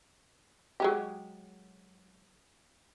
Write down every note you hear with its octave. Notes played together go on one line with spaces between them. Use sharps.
F#3 G#3 G4